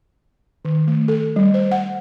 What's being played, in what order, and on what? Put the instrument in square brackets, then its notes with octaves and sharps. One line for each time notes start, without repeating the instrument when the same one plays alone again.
[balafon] D#3
A3
A4
G3
C5
F#5